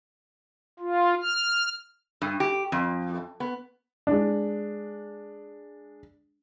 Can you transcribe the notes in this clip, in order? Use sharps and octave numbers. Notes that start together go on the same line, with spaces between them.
F4
F6
G2
G4
F2
B3
G#3 D4